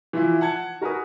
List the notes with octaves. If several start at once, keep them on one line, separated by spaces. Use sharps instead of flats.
E3 F3 E4
F#5 A5 G#6 C#7
F#4 A#4 B4 G#5 D#6